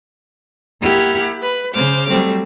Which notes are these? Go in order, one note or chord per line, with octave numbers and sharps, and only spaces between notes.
A#3 E4 G4 F#5 F6 G#6
B4
C#3 C5 D6 F6
F#3 G3 A3 C4